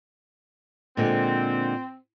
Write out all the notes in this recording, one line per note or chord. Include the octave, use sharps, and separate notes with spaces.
A#2 D3 G#3 C4